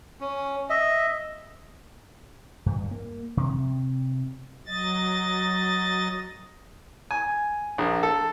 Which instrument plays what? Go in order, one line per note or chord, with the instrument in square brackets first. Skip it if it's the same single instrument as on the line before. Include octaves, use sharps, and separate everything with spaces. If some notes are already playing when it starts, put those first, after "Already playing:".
[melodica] C#4
D#5 E5
[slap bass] G2
A#3
C3
[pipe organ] F#3 D#5 A6
[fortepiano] G#5
A#1
A4